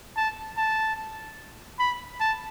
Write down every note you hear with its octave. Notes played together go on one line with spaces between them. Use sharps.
A5
A5
B5
A5